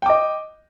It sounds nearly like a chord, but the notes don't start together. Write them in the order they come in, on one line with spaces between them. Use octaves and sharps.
G5 D6 D#5